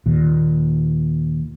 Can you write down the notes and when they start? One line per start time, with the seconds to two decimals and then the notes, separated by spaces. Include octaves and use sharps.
0.06 D#2 A#2